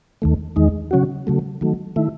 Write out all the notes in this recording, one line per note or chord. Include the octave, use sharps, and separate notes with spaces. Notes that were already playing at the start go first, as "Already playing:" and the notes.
D#2 D#3 A3
E2 D#3 G#3 D#4
C#3 F#3 C#4 F#4
C#3 F#3 A3
D#3 F#3 A3
D#3 A3 E4